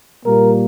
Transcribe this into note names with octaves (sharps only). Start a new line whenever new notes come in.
A#2 G3 A#3 A#4